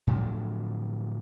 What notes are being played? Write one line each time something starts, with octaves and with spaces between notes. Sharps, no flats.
A2 D3 F3 F#3